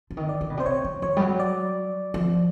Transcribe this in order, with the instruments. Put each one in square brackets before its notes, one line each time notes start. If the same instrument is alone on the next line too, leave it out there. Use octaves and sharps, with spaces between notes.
[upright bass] D3
D#3
[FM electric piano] D5
[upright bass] D3
B2
[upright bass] C3 [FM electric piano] C5
[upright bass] C#3 [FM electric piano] C#5
[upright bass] D#3
[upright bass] E3 [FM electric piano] C#5
[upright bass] G3
F#3
[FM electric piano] D5
[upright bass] F3